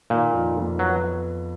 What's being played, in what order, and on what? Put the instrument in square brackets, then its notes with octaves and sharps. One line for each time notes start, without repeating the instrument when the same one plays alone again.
[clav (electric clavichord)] A#2 [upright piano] D#3
[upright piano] F2
F2
[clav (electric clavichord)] F#3 [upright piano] B3